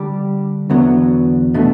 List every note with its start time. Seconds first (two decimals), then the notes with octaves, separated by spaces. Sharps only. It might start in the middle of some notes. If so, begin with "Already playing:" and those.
Already playing: D3 G3 D4 G4
0.70 E2 D3 F#3 B3
1.54 B2 A3 D4